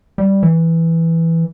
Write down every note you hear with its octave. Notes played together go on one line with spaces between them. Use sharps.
G3
E3